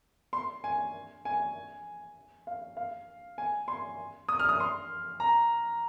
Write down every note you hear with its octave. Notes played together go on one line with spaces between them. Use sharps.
C6
G#5
G#5
F5
F5
G#5
C6
D#6
F6
D#6
C6
A#5